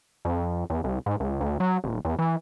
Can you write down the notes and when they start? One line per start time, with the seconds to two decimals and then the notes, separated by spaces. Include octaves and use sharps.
0.25 F2
0.70 E2
0.84 C2
1.06 G#2
1.20 C#2
1.41 D2
1.60 F#3
1.84 D#1
2.05 E2
2.19 E3